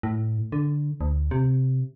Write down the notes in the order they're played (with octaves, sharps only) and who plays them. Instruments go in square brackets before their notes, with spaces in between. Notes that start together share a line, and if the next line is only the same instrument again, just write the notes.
[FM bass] A2
D3
D2
C3